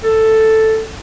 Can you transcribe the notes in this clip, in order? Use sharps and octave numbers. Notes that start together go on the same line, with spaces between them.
A4